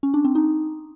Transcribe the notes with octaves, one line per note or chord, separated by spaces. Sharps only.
C#4
D4
C4
D#4